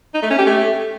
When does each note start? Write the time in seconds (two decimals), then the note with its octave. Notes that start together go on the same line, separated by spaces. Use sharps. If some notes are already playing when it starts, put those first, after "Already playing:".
0.15 D#4
0.23 A3
0.31 C#4
0.39 G4
0.47 A3